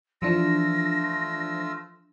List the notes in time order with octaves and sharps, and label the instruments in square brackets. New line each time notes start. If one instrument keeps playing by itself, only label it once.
[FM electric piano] E3 F3 D4 [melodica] A3 F4 E6 [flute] A#6